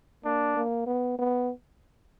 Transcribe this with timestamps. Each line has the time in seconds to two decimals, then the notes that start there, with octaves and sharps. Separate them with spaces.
0.24 A#3 D4
0.56 A#3
0.86 B3
1.18 B3